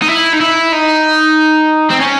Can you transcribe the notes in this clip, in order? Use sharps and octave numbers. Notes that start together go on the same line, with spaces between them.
D#4
E4
D#4
E4
D#4
C4
C#4